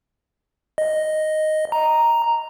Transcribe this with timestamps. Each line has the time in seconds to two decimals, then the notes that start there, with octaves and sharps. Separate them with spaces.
0.78 D#5
1.72 A#5